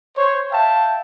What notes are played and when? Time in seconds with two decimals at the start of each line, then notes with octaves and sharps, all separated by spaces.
0.17 C5 C#5
0.51 E5 F5 G5 A5